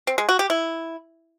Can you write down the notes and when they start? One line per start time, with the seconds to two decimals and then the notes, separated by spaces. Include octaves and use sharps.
0.07 C4
0.18 G#3
0.29 F#4
0.39 G4
0.50 E4